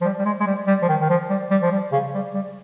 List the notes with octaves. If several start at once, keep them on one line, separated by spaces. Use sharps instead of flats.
F3
G3
G3
G#3
G#3
G3
G3
F3
D#3
D#3
F3
G3
G3
F3
G3
C#3
G3
G3